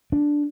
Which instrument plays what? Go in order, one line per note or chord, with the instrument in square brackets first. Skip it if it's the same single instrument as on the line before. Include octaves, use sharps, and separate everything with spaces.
[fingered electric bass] D4